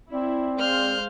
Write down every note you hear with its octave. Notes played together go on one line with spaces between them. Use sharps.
C4 E4 D5
G#3 C5 F5 F6 G6